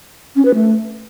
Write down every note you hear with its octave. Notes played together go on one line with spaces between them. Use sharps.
C#4
B4
A3